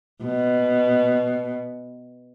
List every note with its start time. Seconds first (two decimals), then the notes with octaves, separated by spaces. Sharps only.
0.24 B2